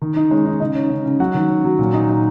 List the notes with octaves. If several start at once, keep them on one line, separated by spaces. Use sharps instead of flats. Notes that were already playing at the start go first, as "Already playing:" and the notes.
D#3
D#4
G#3 C#4 C#5
D#4
C#3 D#4 D#5
C#4
C#3
C#3
F#3 F#4 F#5
D#3
C#4
F#3
A#2
D#4
D#4